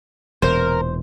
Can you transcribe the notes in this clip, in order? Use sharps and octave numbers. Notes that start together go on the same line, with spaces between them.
E1 E2 A#2 A#4 C5